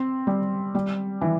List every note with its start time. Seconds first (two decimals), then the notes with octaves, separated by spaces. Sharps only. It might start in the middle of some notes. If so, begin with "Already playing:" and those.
Already playing: C4 C6
0.27 G3
0.75 G3
1.21 E3